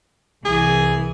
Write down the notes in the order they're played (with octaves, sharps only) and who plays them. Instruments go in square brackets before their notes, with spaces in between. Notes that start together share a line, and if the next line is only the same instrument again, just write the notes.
[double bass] C2 [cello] E3 [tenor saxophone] G#4